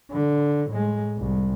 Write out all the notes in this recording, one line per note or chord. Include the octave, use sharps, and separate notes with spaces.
D3
A2 G#3
C2